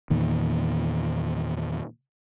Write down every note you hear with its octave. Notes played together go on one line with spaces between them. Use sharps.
E2 A#2 D#3